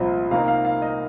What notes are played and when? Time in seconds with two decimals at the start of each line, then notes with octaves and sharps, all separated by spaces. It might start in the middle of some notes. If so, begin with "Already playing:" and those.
Already playing: C2 A#2 F3 C4 D#5
0.31 C3 D#3 A#3 D#4 F5
0.48 F5
0.65 F5
0.82 D#5